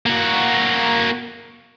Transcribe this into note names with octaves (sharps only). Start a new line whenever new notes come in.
A#3 F#4